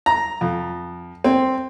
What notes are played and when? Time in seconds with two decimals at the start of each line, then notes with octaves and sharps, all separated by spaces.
0.06 A#5
0.41 F2
1.24 C4